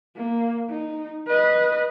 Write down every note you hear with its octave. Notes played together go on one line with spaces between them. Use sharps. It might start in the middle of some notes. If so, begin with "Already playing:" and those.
A#3
D#4
B4 D#5